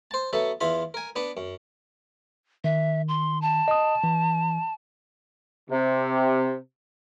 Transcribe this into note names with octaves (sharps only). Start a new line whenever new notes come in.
C5 A5
F#3 B3 A4 E5
E2 E4 F4 B5
A#4 G#5
B3 D4 B4
F#2
D#3 E5
C6
A5
D#5 D#6
E3
C3